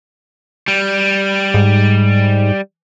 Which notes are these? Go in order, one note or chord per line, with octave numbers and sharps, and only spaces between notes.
G3
G#2